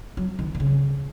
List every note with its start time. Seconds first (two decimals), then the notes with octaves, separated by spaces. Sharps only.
0.17 F#3
0.39 D#3
0.55 A#2
0.60 C#3